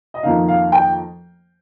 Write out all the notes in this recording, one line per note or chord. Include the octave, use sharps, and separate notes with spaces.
D#5
F2 D#3 A#3 D#4 F5
F5
G5